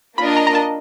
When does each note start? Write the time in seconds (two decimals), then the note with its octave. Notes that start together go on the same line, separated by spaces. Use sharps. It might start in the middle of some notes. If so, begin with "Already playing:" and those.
0.17 A#3 D4 F4 A#4 D#5 B5
0.37 A#5
0.47 A#5
0.55 A5